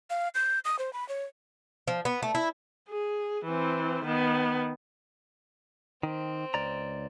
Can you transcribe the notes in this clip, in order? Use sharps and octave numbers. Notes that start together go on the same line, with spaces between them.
F5
G6
D#6
C5
B5
C#5
F3
B3
A3
E4
G#4
E3 C4
D#3 B3
D#3 C4
C#2 D5 A#5